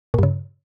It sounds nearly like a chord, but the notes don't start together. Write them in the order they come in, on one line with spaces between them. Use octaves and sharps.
A#2 G2 C#3